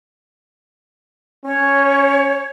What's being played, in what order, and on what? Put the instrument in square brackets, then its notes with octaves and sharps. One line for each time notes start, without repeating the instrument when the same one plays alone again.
[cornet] C#4 [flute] C#5